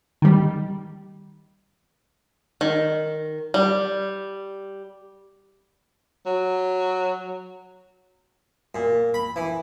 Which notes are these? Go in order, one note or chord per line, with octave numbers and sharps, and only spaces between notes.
D#3 G3
D#3
G3
F#3
A#2
B5
E3